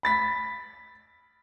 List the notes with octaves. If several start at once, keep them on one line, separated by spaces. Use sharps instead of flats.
B5 A6 B6